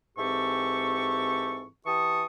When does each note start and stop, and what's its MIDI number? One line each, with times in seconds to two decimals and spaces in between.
0.17 1.66 44
0.17 1.66 52
0.17 1.66 60
0.17 1.66 67
0.17 1.66 69
0.17 1.66 85
1.86 2.25 52
1.86 2.25 67
1.86 2.25 81
1.86 2.25 85
1.86 2.25 87